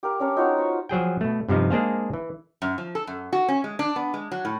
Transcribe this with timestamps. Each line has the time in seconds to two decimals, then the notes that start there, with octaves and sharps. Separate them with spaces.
0.03 G4 A#4 F5
0.20 C#4 D4 A#4 C#5
0.37 D#4 F4 F#4 C#5
0.58 C5 C#6
0.89 F3 F#3 G#4 G5
1.21 B2 A3
1.49 G2 C3 F3 D#4
1.70 G#3 A#3 D4 G#4 C5 F5
2.13 E3
2.62 F#2
2.78 F3
2.95 A4
3.07 F#2
3.33 F#4
3.48 C#4
3.64 G#3
3.79 D4
3.96 B3
4.14 G#3
4.32 F#3
4.45 A2